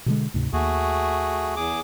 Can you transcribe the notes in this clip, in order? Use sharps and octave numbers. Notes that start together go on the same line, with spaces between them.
B2 D3 G#3
D2 G#2 C3
D#2 A3 F#4 G#4
E2 G#4 D6